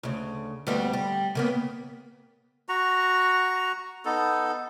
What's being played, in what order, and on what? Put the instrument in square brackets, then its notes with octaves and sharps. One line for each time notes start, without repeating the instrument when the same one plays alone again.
[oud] D2 C#3
D2 G3 B3
G3
C#3 A#3 B3
[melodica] F#4 A#5 C#6
B3 D#4 A4